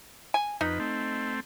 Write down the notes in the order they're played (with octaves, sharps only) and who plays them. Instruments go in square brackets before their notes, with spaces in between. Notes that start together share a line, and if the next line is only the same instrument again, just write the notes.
[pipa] G#5
[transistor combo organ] F2 B4 [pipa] D#4
[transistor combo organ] A3 C4